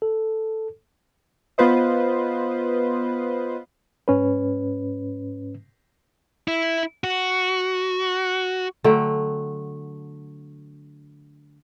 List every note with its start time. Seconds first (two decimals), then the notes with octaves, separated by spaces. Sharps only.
0.02 A4
1.58 B3 F4 B4 C5 D#5
4.08 G#2 C#4 B4
6.48 E4
7.04 F#4
8.84 D3 F#3 A3 G5